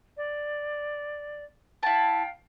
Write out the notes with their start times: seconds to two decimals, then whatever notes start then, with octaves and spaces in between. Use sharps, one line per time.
0.16 D5
1.83 E4 F5 G5 A5